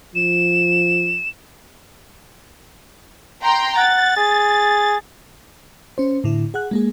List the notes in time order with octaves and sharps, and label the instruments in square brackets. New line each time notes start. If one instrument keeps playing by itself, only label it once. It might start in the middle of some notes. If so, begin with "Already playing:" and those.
[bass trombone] F3 [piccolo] E7
[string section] G5 A#5 C6
[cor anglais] F#5 [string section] A6
[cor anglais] G#4
[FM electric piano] C#4 C5
A2 D3 E4
G#4 F#5 F#6
G#3 A#3 G#4